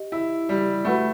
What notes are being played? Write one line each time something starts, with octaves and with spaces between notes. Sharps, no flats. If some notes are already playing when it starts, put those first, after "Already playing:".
Already playing: G4 D#5
E4
G3
A3 F#4 B4 F#5 B5